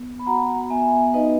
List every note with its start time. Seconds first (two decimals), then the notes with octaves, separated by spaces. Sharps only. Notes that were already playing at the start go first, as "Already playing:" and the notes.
Already playing: B3
0.19 B5
0.26 F#4 F#5 A#5
0.70 B3 E5 G#5
1.14 D#4 B4 D#5